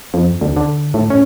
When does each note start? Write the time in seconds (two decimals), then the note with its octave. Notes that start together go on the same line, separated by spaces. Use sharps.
0.14 F2
0.41 D2
0.57 D3
0.94 A2
1.10 C#4